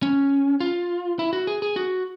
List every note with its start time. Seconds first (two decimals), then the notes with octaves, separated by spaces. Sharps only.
0.02 C#4
0.60 F4
1.19 E4
1.33 F#4
1.47 G#4
1.62 G#4
1.76 F#4